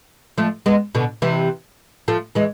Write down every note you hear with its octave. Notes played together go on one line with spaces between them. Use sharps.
F3 A3
G#3 B3
B2 D3
C3 E3
F3 A3
E3 G#3